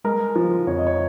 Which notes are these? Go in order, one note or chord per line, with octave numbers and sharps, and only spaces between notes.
G#3 A#4
F3
F2 C#5
D#5
C#5